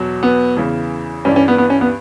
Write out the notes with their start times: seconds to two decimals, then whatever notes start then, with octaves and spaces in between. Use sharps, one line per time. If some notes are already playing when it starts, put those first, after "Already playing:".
Already playing: E2 B2 F#3
0.23 B3
0.57 E2 C#3 E3
1.25 G2 E3 G3 C#4 D4
1.36 C#4
1.48 B3
1.58 B3
1.70 C#4
1.81 B3